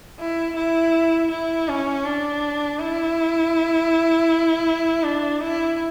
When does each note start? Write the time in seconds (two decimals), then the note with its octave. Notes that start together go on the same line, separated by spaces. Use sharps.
0.20 E4
0.56 E4
1.31 E4
1.69 C#4
2.05 D4
2.80 E4
5.03 D4
5.41 E4